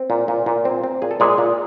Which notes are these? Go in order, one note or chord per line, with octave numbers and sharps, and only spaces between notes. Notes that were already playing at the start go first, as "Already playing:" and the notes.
Already playing: C4
A#2
A#2
A#2
C4
C4
A#2 G#4
A4
A#2 G#3 G#4
A#2